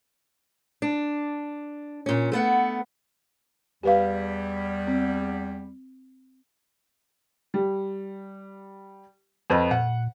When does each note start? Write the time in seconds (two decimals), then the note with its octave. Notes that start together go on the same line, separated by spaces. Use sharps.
0.82 D4
2.06 A#2 C#4
2.32 A3 B3 F#5
3.83 E2 G3 G4 B4 F5
4.87 C4
7.54 G3
9.50 F2 B4 D#5
9.71 A#2 F#5